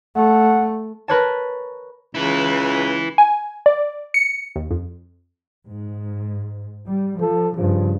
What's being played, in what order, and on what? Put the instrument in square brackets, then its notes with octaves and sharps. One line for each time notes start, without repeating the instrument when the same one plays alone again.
[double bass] A3 [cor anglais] F#5
[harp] A#4 B4 C#5 A5
[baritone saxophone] C#2 [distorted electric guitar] E4 B4
[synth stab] G#5
D5
C#7
D#2
F2
[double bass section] G#2
G3
[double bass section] F3 [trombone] A4
[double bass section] G2 C#3 [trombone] F3